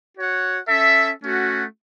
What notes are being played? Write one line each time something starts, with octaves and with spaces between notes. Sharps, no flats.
F#4 C#5 F#5
C#4 A4 E5
A3 C#4 F#4